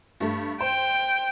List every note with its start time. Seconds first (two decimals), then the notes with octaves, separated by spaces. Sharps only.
0.20 G2 A3
0.61 C5 G5